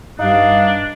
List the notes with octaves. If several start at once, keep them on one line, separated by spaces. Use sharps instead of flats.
G2 D4 D#4 F5